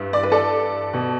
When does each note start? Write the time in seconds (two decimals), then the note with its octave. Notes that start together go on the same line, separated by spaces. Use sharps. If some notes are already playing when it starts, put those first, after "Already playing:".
Already playing: G2 E3
0.13 D5
0.23 B4
0.32 A4 D5
0.93 B2